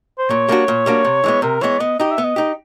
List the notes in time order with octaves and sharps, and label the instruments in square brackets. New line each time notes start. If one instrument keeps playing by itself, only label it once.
[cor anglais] C5
[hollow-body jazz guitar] A#2 [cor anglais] C#5
[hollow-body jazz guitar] G3 A#3 D4 F#4
A#2
G3 A#3 D4 F#4
C3
E3 G#3 B3
[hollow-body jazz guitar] C3 [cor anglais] A#4
[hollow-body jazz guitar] E3 G#3 B3 [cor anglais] C#5
[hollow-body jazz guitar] B3 [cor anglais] D#5
[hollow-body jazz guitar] D#4 G4 [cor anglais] D#5
[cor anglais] E5
[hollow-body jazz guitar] B3
[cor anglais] D#5
[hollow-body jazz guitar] D#4 G4